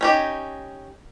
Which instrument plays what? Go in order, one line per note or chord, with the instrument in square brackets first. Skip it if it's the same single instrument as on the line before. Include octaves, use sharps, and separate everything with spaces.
[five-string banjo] C#4 D#4 G4